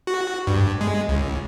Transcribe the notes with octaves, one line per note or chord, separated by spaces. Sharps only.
F#4
G2
G#3
C#2